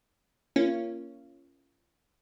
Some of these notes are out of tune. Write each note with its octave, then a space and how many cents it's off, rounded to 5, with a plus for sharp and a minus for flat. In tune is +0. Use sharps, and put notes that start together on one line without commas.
A#3 +0 C#4 +0 F4 -30